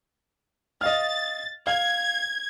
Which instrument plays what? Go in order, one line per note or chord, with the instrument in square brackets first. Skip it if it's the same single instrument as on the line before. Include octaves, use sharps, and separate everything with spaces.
[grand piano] D#5 F5 F6 [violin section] A6
[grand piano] F5 [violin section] G#6